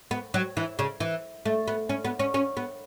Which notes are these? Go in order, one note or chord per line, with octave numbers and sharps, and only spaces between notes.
B3
F#3
E3
C#3
E3
A3
B3
C#4
B3
C#4
C#4
B3